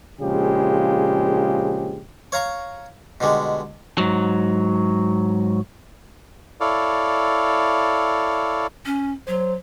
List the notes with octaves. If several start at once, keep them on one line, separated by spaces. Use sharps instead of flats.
A#1 C#3 F3 G#3 G4
C#5 F5 A#5 C#6
B2 D3 G3 G#3
G#2 F#3
E4 A4 C#5 D5 F5
C#4
F#3 C5